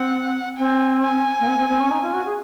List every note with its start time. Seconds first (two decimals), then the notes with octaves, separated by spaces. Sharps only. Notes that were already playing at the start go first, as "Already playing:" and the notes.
Already playing: C4 F#5
0.57 C4 G#5
1.03 G#5
1.39 A#3
1.47 C4
1.58 C4
1.69 C4
1.80 C#4
1.90 D#4
2.02 F4
2.13 F#4
2.25 G#4